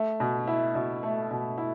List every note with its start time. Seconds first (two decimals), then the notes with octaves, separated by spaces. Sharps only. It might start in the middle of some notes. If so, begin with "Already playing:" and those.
Already playing: A3
0.20 B2
0.47 E4
0.75 B2
1.03 A3
1.31 B2
1.58 E4